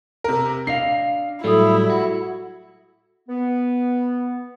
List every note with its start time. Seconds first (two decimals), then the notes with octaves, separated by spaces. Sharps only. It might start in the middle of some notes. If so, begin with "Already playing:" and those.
0.24 C3 A#4
0.67 D4 D#5 F5 C7
1.44 A2 F#3 G3 E4 A4 E5 D#6
1.90 F#4
3.29 B3